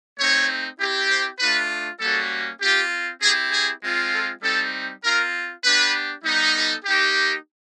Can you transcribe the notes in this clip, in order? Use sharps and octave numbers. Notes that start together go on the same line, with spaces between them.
A3 C4 D#4 C#5
C4 E4 G4
C5
A3 D4 F4 B4
G3 A#3 C#4 F#4 A4
C4 F4 G4
C4 E4 G4 G#4
G#4
G#3 C4 F4
A4
G3 C4 D#4 A4
C4 F4 A#4
B3 D4 G4 B4
G3 B3 D#4
A4
A#3 D#4 G4